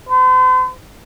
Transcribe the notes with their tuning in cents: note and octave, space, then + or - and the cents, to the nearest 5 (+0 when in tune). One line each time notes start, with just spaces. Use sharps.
C5 -45